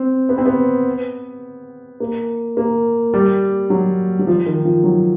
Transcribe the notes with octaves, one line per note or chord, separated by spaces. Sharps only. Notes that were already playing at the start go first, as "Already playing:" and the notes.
Already playing: C4
B3
C4
B3
A#3
A#3
G3
F#3
F#3
F3
D#3
F3
F#3